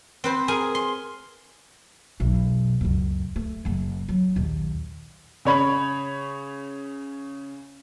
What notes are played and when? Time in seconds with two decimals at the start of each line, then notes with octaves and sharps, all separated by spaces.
0.24 C4 B4 C5
0.48 G#4 A#4 G#5
0.75 C6
2.20 E1 B1
2.81 C#2 F#2
3.36 A3
3.65 F#1 F#3
4.09 F#3
4.36 A#1 D#2
5.45 C#3 C#5 B5